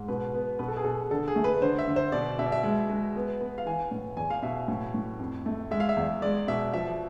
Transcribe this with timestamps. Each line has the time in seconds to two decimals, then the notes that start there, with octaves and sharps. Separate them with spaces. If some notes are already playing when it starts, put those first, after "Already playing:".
Already playing: G#2
0.08 B2 B4
0.34 B3
0.59 B2 B4
0.68 A4
0.77 G#4
0.85 B2 A4
1.11 D3 A4
1.28 G#4
1.36 A3
1.44 B4
1.61 D3 C5
1.79 E5
1.87 D3
1.96 C5
2.12 B2 D5
2.39 B2 E5
2.46 D5
2.52 E5
2.63 G#3
2.89 G#3
3.16 B3
3.41 B3
3.58 F5
3.66 E3 G#5
3.91 A2
4.17 E2 G#5
4.30 F5
4.42 B2 E5
4.57 F5
4.68 A2
4.94 A2
5.19 F2
5.46 A3
5.71 G#3 E5
5.80 F5
5.89 E5
5.97 E2
6.22 G#3 D5
6.48 B2 E5
6.73 F3 E5